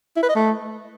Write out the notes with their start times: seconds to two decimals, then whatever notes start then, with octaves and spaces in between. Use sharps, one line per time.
0.17 E4
0.23 B4
0.29 D#5
0.36 A3